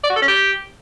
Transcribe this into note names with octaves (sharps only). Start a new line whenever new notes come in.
D5
F#4
A4
C#4
G4